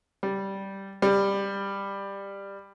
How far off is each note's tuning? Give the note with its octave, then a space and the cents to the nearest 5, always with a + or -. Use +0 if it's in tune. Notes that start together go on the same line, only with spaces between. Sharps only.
G3 -10
G3 +10